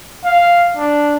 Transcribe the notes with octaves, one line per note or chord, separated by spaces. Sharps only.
F5
D4